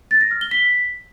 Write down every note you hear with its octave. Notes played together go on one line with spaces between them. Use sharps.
A6
A#6
F6
G7
B6